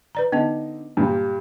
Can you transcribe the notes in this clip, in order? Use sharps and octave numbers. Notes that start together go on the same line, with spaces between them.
B4 D5 A#5
D3 B3 D#4 D#5 A5
G2 A#2 G3